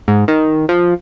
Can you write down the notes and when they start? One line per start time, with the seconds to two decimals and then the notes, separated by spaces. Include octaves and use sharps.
0.08 G#2
0.28 D#3
0.69 F3